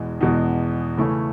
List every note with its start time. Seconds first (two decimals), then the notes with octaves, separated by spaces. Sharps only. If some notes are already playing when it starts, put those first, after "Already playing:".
Already playing: E2 B2 G#3
0.21 E2 B2 G#3
0.97 C#3 E3 A3 C#4 E4